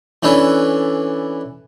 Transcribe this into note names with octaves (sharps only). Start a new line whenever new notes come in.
E3 C#4 D4 A4 B4